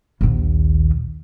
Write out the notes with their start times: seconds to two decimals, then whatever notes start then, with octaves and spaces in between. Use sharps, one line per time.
0.21 A#1 D#2